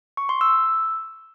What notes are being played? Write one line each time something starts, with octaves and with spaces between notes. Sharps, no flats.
C#6
C6
E6